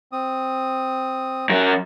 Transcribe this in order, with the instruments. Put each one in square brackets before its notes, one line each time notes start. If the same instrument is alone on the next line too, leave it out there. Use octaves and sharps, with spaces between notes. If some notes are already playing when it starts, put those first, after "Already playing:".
[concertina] C4 D#6
[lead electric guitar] F#2 F#3